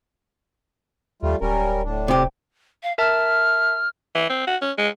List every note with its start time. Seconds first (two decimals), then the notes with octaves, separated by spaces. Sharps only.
1.22 D#2 G3 A3 F4
1.41 D1 G3 C#4 A#4
1.84 A2 D4
2.08 C3 G4
2.83 F5
2.98 A#4 E5 A5 F6
4.15 E3
4.29 C4
4.47 F#4
4.61 C#4
4.78 G#3